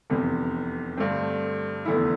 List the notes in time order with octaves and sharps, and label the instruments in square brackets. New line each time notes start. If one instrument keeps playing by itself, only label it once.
[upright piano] F1 E2 C3
G2 D3 A3 C4
F1 E2 D3 A3 E4